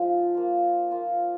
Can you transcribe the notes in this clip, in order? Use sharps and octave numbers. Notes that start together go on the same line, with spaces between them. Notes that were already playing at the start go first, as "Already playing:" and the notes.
Already playing: F3 G#3 D#4 F4
A#3 F4
A#3 F4